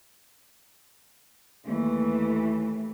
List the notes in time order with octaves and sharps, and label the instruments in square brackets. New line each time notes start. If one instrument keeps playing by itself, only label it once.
[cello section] D#2 E3 A3